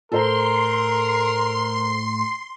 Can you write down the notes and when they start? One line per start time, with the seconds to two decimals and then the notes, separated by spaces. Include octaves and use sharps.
0.12 A2 A4 A#4 C5 A#5 C6